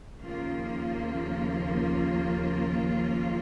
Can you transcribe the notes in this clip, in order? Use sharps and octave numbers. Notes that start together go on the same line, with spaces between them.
D#2 C#3 F3 A#3 F4